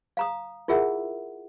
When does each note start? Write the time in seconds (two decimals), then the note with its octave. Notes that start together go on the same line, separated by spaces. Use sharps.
0.17 F5 A#5 D#6
0.68 E4 F4 G#4 A#4 E5 F#5